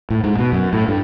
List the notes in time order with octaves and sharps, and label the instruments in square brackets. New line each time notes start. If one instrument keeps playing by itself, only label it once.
[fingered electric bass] A2
G#2
B2
F#2
A2
G2